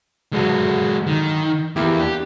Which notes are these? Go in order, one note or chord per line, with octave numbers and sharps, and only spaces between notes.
G2 D3 F#3 G#3 F#4
D#3
E2 A#3 E4 G4
D4 G4